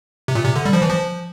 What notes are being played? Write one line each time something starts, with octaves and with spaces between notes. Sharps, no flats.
C3
A#2
C3
D3
G3
F3
E3
F3